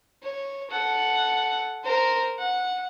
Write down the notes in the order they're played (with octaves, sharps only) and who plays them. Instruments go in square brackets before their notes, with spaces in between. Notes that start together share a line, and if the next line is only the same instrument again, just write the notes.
[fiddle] C#5
A4 F#5
A#4 C5
F#5